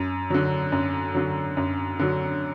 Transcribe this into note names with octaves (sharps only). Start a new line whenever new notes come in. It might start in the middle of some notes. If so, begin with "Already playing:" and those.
Already playing: F#2
D3 F#3
F#2
D3 F#3
F#2
D3 F#3